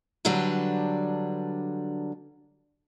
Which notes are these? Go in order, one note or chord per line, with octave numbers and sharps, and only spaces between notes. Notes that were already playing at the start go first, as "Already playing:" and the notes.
D3 F#3 G3 D4 B4